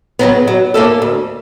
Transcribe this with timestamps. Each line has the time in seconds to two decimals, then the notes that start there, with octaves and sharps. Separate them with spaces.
0.19 C#3 F#3 B3
0.47 F#3
0.74 A#3 C#4 E4 A4
1.02 D2